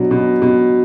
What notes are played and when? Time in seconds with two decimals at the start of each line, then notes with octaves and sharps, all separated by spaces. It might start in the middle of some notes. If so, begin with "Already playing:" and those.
Already playing: B2 F#3 D4
0.11 B2
0.42 B2